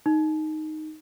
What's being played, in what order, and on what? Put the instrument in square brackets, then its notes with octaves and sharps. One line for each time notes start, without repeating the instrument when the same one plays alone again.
[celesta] D#4